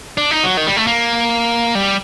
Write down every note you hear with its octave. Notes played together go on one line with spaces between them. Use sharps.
D4
D#4
F#3
D#3
G3
A3
A#3
G3